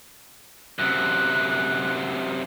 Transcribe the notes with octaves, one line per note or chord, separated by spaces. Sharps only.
F#2 C3 F#6